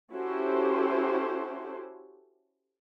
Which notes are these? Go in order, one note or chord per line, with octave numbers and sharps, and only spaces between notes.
C#4 E4 F#4 G4 A4 C5